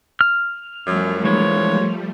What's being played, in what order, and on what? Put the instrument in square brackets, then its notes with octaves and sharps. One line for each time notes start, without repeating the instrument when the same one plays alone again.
[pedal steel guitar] F6
[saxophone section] F#2 [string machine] F3 G3 A3
[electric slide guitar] E3 G#3 [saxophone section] A#3 C5 C#5